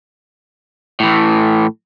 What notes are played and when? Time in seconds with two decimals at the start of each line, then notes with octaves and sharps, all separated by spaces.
1.00 A2 E3